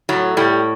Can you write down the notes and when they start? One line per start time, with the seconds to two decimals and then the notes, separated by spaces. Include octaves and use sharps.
0.09 A2 F#3
0.37 A2 G3